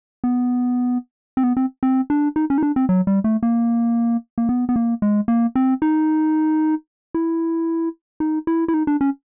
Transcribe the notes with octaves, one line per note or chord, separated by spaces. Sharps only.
B3
C4
B3
C4
C4
D4
D#4
C#4
D#4
D4
C4
F#3
G3
A3
A#3
A#3
B3
B3
A#3
G#3
A#3
C4
D#4
E4
D#4
E4
E4
D#4
D4
C#4